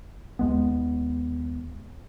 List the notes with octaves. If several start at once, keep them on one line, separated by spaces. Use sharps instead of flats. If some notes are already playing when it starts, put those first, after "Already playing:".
D#2 G#3 B3